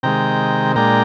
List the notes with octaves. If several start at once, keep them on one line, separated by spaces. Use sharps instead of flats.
C3 D#3 G#3 G5 A#5
A#2 G#3 D4 G5 A#5